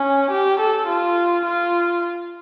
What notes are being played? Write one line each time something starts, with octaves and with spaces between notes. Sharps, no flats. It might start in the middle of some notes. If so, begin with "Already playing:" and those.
Already playing: C#4
G4
A4
F4
F4